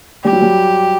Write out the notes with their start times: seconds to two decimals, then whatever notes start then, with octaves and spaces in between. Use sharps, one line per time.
0.24 G3 G4
0.32 F#3
0.42 G3